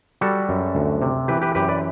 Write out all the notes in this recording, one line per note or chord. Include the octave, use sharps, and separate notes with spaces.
G3 F#4 A4
F#2
D2
C3
E3 G4 B4
G4 B4
F#2 G4 B4
B4 D5